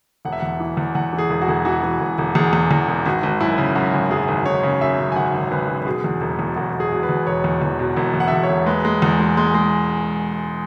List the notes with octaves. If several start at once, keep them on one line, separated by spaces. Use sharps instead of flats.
E1 F#5
E5
E2 F#5
E3
E2
E2 F#5
E3
G#4
E1
F#4
E1
E3 F#4
E3
E1
E1
E2 G#4
E2
E2
E1
G#1 F#4
G#1
F#2 E4
C#3
F#2 F#4
G#1
F#2 G#4
G#1
G#1 C#5
C#3
F#2 E5
F#2
G#5
G#1 F#5
G#1
G#1 B4
F#2
B4
B2 G#4
E2
E1
E2
E1 F#4
E1
G#4
B2
B4
E2
E1 C#5
E2
E2
B2
E1
E2
F#5
E5
E1 F#5
C#5
E1
G#3 B4
G#3
E2
G#3
G#3
G#3